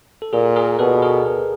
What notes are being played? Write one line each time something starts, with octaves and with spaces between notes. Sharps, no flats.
A4
A#2 G#4 A#4
G#4 A#4
B2 A4 B4
G#4 A#4